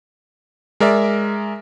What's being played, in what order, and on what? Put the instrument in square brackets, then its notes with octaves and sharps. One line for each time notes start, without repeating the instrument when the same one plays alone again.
[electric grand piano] G#3 A#4 D5 E5